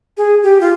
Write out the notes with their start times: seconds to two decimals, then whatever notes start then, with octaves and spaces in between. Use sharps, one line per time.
0.17 G#4
0.43 G4
0.61 F4